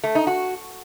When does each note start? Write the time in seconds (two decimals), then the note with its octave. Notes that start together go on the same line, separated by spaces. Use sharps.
0.04 A3
0.15 D#4
0.27 F#4